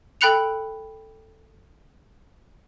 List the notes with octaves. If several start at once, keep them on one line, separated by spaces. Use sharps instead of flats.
A4 G5 B5 F#6 C#7 F7